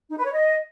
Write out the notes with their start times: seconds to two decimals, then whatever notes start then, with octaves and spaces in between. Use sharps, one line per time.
0.10 D#4
0.18 B4
0.25 C#5
0.33 D#5